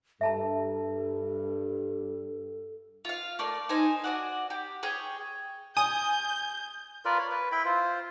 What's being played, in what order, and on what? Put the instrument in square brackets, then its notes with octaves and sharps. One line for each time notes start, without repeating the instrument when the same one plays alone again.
[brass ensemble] G2 [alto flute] A4 [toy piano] E5 A5 A#5
[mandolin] F4 F5
A3 A#3 D5
D#4 C5 G#5
F#4 D5 F#5
G4
G#4 C#5 G5
[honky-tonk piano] G#5 [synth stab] D#6 [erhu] G6
[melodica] F4 A#4 B4 D5
C#5
B4
E4 G5 B5
F4 C5